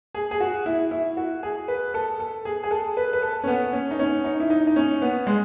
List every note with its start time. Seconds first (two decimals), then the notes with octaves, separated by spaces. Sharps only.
0.15 G#4
0.31 G#4
0.40 F#4
0.66 E4
0.91 E4
1.17 F#4
1.43 G#4
1.68 B4
1.94 A4
2.20 A4
2.45 G#4
2.63 G#4
2.71 A4
2.97 B4
3.13 B4
3.22 A4
3.44 C#4
3.48 B3
3.73 C#4
3.91 D#4
3.99 C#4
4.24 D#4
4.40 E4
4.50 D#4
4.67 D#4
4.76 C#4
5.02 B3
5.27 G#3